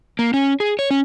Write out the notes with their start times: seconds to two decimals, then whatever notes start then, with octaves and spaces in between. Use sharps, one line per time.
0.19 A#3
0.34 C#4
0.60 G#4
0.79 C#5
0.91 C#4